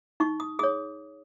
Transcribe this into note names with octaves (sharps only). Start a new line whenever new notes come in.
D#4 C#6
D#6
G#4 C#5 D#6